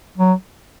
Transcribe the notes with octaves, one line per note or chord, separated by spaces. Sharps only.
F#3